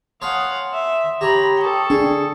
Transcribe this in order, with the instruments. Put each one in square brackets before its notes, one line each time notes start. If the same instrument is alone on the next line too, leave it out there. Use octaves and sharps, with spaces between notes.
[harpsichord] C#5 G#5 A5 [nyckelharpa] F5 F#5 [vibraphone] C6 D#6
[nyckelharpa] E5
[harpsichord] G4 C#5 [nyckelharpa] A#5 B5
[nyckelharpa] A4 C#6 [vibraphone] G5 D#6
[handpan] D4 [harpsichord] G#4